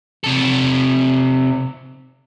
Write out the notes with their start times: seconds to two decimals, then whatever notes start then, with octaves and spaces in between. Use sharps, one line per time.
0.24 C3 A4